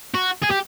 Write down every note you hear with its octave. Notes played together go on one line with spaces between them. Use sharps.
F#4
G#4
G4